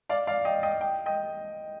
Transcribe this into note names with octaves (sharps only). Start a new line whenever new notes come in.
D5 F5
D5 F5
D#5 G5
D#5 G5
G5
D#5 G5